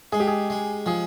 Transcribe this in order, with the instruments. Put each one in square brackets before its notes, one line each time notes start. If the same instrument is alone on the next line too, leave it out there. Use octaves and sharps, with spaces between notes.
[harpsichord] G#3 [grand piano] G#4
[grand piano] G4
G#4
[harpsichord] G#3
[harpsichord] F3 [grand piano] G#4